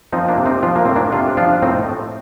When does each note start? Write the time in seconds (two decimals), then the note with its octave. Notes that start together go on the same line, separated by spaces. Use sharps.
0.13 F3 C4 D#4
0.28 A#3 D4
0.38 C3
0.46 C4 D#4
0.63 F3 D4 F4
0.76 A#3
0.85 A2 C4
0.96 A#3 D4
1.12 C3 D4 F4
1.37 F3 D4 F4
1.62 A2 C4 D#4